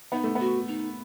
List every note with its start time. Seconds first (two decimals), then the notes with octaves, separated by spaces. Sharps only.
0.12 B3 D#4
0.24 A3
0.35 B3 F#4
0.68 D#4